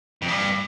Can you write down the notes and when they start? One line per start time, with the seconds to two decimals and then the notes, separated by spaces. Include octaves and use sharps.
0.22 F2
0.28 G2